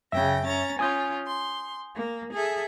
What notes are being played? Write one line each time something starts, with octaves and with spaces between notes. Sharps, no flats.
F#2 C#3 E5 G5 A#6
C#4 A#5 A6
C#4 F4 G#5 D#6 G6
C6
A#3
G#4 A4 E5